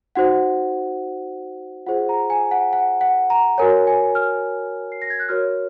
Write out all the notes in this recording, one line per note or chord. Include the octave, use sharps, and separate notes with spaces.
D#4 F#4 C5 F#5
F4 G#4 C5 F#5
A#5
G#5
F#5
F#5
F#5
A#5
F#4 A#4 C#5 G#5
G#5
F6
C7
A#6
G#6
F#6
F#4 A#4 C#5 F6